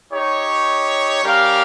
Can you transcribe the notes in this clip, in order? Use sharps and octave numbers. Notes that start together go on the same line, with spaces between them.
D#4 G4 C#5
G3 C#4 G4 A#4 F5